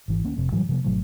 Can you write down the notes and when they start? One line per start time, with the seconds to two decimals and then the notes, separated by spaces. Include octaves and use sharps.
0.08 G#1 E3
0.24 D2 A#3 C#4
0.36 F1 F2 C3
0.52 A2 E3 F#3 G3
0.69 C3 F3 A#3
0.84 G#1 B2 F#3 A3